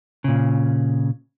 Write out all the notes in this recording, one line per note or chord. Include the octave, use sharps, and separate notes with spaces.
A#2 C#3